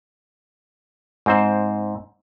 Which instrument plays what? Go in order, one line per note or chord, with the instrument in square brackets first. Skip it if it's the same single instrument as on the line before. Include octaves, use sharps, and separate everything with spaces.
[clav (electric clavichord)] G#2 C4 C5